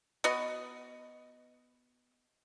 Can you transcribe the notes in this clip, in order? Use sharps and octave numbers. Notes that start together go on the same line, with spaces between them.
B3 F#4 D#5